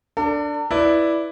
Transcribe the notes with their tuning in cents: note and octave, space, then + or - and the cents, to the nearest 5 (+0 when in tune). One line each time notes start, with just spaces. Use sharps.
D4 +0 A4 +40
E4 +0 B4 +0 D5 +0